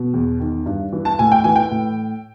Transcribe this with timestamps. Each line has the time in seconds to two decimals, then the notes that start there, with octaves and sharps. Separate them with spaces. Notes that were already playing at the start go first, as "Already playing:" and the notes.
Already playing: B2
0.14 E2
0.40 D#3
0.66 G2
0.93 E3
1.05 A5
1.19 A2 G#5
1.32 G5
1.44 E3 G#5
1.56 G5
1.71 A2